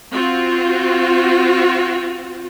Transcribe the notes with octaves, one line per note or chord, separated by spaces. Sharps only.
C4 F4 F#4